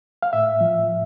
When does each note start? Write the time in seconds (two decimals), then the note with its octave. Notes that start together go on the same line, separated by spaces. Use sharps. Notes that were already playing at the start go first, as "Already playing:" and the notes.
0.22 F5
0.33 A2 E5
0.61 F3
0.87 A2